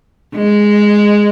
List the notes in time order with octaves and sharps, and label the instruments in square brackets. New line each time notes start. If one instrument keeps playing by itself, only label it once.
[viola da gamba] G#3